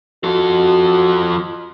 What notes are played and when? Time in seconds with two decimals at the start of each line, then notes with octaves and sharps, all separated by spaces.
0.24 F3 F#4 A4